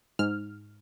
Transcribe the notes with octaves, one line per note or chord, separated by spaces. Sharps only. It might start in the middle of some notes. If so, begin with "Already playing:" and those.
G#2 F6